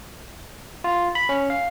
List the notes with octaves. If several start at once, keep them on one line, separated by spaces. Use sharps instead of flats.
F4
B5
C#4
F5